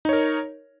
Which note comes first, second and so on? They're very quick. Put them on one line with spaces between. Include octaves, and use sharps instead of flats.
D#4 C#5 A#4